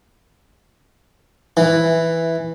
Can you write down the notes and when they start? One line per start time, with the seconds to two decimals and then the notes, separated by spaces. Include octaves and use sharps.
1.57 E3